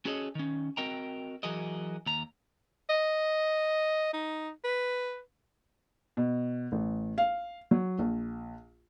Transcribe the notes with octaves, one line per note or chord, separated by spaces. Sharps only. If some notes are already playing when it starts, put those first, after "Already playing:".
C#4 F#4 G#4 A4 C#5 D#5
D#3 C#4
C4 F#4 A#4 D#5 G5 A#5
E3 F#3 F#4 G#4 A#4 D#5
D#2 A#5
D#5
D#4
B4
B2
A1
F5
F#3
A#1